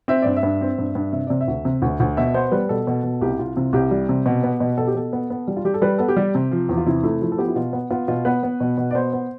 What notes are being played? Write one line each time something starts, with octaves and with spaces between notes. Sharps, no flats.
C4 E5
G2 D5
E5
G2
C4
G2
G2
C3 E5
C3 D5
E5
D2
C3
D2
D2
B2 E5
B3 C5
G3 B4
B2 A4
B2
B2
C2 G4
C2 F4
C3 F4
C2 G4
G3
C3
B2
B3
B2
B2 A4
G4
B2 A4
B3
B3
G3
F4
G3 G4
A4
G3 B4
B3 A4
G4
G3
C3
F3
E2
F4
C3 E4
A3 E4
F3 E4
A4
B3 G4
E4
B2 F4
B3
B3 F4
B2 F4
B3 B4
B3
B2
B2
D5
B3 C5
B3